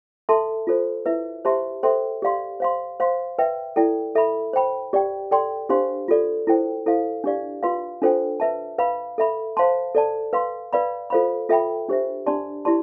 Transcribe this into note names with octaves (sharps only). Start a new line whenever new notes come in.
A4 E5 A5 C6
F4 A4 C5
E4 B4 E5
G4 C5 E5 A5 C6
A4 C5 E5 G5 C6
G4 D5 F5 C6
C5 F5 C6
C5 F5 C6
B4 E5 G5
E4 A4 D5 G5
A4 E5 B5
C5 G5 B5
G4 D5 G5
A4 D5 G5 C6
D4 G4 C5 F5 C6
F4 A4 D5
E4 A4 C5 G5
E4 A4 C5 F5
D4 G4 D5 F5
F4 B4 F5 C6
D4 F4 A4 C5 G5
B4 E5 A5
B4 F5 B5
A4 E5 B5
C5 F5 A5 C6
A4 D5 A5
B4 F5 C6
B4 D5 F5 B5
F4 A4 C5 F5 B5
F4 A4 E5 G5 B5
D4 G4 C5 E5
D4 G4 D5 A5 C6
E4 G4 D5 A5 C6